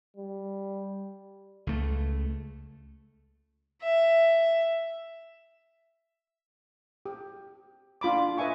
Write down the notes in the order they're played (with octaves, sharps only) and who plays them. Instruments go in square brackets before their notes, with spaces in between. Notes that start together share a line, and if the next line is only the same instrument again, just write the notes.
[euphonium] G3
[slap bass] C#2 A3
[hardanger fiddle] E5
[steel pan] G4
D4 F4 B5 D6
B4 D#5 E5 G#5 C#6